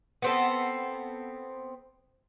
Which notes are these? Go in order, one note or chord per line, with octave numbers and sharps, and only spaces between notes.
B3 C4 A4